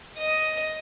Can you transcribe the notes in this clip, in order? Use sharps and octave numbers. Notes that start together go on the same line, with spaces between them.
D#5